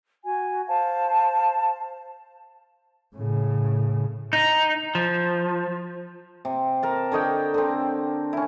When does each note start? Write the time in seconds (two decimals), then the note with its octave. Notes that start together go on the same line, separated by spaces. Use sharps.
0.24 F#4 G#5
0.68 C5 F5 A5
3.15 A2 C#3
4.33 D#4
4.95 F3
6.45 C3
6.83 A#4 A5
7.12 D3 C#5 D#5 G5
7.54 D3 C4
8.33 C#4 E4